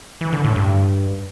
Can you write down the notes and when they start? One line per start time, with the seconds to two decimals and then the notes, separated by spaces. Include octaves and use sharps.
0.21 E3
0.33 D3
0.44 A2
0.56 G2